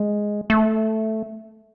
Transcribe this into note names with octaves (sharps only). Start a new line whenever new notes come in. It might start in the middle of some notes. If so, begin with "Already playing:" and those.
Already playing: G#3
A3